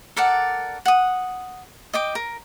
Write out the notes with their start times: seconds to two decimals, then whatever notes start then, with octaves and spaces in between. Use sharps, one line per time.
0.16 A4 A#4 D5 F#5
0.85 F#5 D#6
1.93 D#5 G5 D6
2.15 A#4